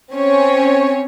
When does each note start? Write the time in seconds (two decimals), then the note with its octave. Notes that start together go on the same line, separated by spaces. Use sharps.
0.13 C4 C#4 C#5